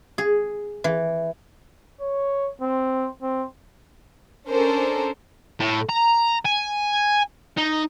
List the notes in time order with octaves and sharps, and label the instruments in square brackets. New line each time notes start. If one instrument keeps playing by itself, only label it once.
[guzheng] G#4
E3
[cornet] C#5
C4
C4
[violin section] C#4 D4 A4 A#4 C5
[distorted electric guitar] A2
A#5
G#5
D#4